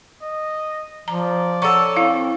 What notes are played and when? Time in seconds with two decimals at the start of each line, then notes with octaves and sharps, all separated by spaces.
0.23 D#5
1.08 F3 D5 A#5
1.62 C#4 A4 F#5 A#5 C#6
1.96 C4 E4 F5